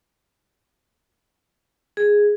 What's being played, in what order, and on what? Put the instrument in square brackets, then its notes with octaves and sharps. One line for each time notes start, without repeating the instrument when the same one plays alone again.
[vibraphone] G#4